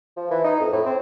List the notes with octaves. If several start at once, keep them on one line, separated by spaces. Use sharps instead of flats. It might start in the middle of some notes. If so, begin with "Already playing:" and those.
F3
E3
D#4
F2
A2
C4